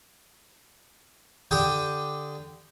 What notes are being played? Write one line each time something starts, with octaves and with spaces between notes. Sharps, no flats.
D3 G4 G5 D#6